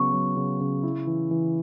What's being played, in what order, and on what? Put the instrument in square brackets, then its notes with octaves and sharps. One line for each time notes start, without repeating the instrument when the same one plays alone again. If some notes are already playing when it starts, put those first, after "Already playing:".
Already playing: [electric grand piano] C#3 F#3 B3 [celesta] C#6
[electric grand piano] F#3
C#3
C#3
E4
E3
E3